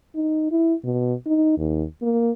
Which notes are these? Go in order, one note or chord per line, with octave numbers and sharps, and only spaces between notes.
D#4
E4
B2
D#4
D#2
A#3